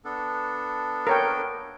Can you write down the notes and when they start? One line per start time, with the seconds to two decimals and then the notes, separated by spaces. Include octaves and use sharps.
0.05 B3 D4 A4
1.07 A#4 C#5 G5